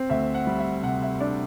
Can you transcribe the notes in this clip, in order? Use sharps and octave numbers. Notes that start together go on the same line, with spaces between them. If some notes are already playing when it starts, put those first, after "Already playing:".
Already playing: C4
D2 E5
F#5
G3
E5
C3 F#5
E5
D4 D5